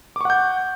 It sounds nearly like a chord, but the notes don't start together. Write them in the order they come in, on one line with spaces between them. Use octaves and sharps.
D6 C#6 F#5 G6